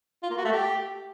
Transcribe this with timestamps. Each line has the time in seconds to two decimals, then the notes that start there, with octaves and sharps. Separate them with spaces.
0.23 F4
0.30 A#3
0.38 F#4
0.45 A3
0.52 G4